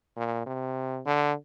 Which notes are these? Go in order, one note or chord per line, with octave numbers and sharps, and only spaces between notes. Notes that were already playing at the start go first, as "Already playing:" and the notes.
A#2
C3
D3